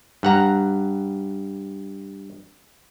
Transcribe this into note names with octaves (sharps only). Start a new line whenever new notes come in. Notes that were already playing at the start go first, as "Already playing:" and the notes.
G2 F#5 A#5